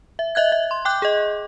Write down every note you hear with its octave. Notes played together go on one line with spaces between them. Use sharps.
E5
D#5 E5 F#6 G#6
E5
C6
G5 D6 F#6 G6
G#4 D#5